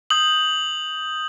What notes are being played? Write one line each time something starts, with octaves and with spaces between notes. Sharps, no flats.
D#6 G6 F#7